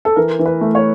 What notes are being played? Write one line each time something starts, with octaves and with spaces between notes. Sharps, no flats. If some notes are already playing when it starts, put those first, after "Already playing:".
A4
E3 A#4
E3
B4
A3
C#5